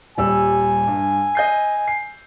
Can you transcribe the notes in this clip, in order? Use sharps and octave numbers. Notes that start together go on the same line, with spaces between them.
D#1 G3 G#5 E6
G2
D#5 G6 C7
C7